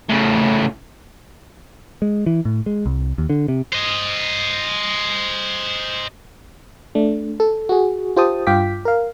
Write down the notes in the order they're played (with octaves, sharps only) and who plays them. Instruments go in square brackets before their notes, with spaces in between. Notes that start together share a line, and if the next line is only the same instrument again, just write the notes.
[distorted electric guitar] A2 C#3
[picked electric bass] G#3
E3
A2
G#3
C2
D#2
D3
C3
[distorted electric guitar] C5 D#5
[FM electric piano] A3 D4
A4
F#4 G#4
F4 G4 C5 G5 A5 D#6
G2 F4 F5 G5 D6 B6
A#4 F5